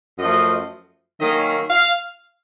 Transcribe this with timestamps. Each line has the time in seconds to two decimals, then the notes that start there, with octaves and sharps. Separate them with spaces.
0.19 F#2 F3 A3 D#5
1.20 D#3 F#3 A#3 C#4 D#5
1.70 F5